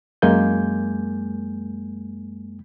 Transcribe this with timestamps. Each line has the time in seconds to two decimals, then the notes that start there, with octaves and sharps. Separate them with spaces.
0.22 F#2 G#3 A#3 G#5 G6